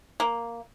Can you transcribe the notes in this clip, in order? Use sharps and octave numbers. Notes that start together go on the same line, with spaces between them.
A#3